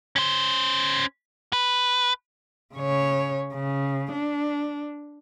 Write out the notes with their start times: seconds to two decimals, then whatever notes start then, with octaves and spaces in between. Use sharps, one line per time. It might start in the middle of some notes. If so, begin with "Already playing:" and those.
0.16 C#4 C5
1.53 B4
2.74 C#3 C#5
3.54 C#3
4.12 D4